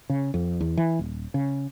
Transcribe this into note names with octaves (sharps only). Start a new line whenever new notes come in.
C#3
F2
E2
E3
D#1
C#3